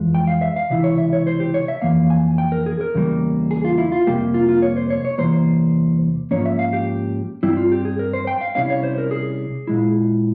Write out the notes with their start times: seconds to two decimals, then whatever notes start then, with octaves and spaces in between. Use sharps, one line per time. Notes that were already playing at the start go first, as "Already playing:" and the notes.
Already playing: F2 E3 G#3
0.15 G5
0.27 F5
0.42 E5
0.56 F5
0.70 C#2 C3 E3 E4 E5
0.84 C#5
0.98 E5
1.13 C#5
1.27 C5
1.40 G4
1.54 C#5
1.68 E5
1.82 F2 E3 A#3 F5
2.10 G#5
2.38 G5
2.52 A#4
2.66 G#4
2.81 A#4
2.94 E2 C#3 E3 G3 A#3
3.51 G#4
3.65 F4
3.78 E4
3.92 F4
4.07 F2 C3 G3 A#3 G4
4.34 F4
4.49 F4
4.62 C#5
4.76 C5
4.90 C#5
5.05 C#5
5.18 E2 C3 E3 G3 A#3 C5
6.31 G#2 F3 A#3 C#4 C#5
6.46 E5
6.59 F5
6.73 G4
7.43 G2 G3 C4 E4
7.57 F4
7.72 G4
7.85 G#4
7.99 A#4
8.13 C5
8.27 G5
8.41 F5
8.55 C2 C3 G3 C#4 E4 F5
8.70 C#5
8.83 C5
8.98 A#4
9.11 G#4
9.67 A#2 G#3 E4